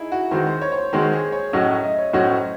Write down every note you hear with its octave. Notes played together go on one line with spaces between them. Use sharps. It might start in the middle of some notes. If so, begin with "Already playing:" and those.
Already playing: D#4 E4 G#4
F#4
D#3 G#3 C4 F#4 C5
C5
C#5
C#5
C5
D#3 G#3 C4 F#4 C5
G#4
C#5
A2 F#3 C#4 F#4 D#5
E5
D#5
C#5
A2 F#3 C#4 F#4 C5